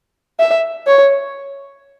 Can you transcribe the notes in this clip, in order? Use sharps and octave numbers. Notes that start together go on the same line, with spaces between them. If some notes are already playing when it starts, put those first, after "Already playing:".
E5
C#5